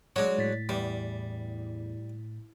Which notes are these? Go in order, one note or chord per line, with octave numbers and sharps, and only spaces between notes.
F#3 G#3 D4 C#5
A2 A6 B6
E2 G3